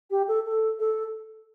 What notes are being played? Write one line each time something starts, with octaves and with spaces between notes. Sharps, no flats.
G4
A4
A4
A4